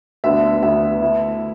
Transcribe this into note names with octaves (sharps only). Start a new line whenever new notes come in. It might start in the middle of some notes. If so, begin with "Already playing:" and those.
D2 D3 B3 D4 E5
D2 D3 B3 D4 E5
D3 A3 E4